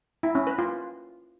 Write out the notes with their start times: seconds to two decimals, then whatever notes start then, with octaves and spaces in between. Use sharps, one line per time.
0.23 E4
0.35 C#4
0.47 B4
0.59 F4